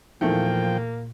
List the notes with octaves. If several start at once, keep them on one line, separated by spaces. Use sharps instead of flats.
E2 A#2 D#3 F3 A3 A#3 G5